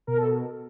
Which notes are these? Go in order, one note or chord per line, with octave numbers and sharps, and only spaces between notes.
B2 A#4
A4